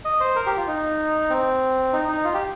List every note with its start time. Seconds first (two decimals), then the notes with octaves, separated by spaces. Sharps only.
0.05 D#5
0.20 C5
0.36 A#4
0.46 G4
0.57 F4
0.67 D#4
1.30 C4
1.93 D#4
2.09 D#4
2.25 F4
2.34 G4